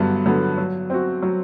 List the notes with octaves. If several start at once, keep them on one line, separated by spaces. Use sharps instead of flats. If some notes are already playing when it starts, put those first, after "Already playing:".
Already playing: G2 D3 F#3 B3
D3 F#3 B3
F#3
C4 F#4
F#3